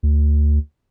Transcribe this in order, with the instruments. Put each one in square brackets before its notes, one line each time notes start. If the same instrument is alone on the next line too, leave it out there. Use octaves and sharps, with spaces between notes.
[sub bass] D2